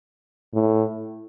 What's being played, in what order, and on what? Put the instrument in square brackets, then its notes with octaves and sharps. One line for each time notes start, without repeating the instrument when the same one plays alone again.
[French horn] A2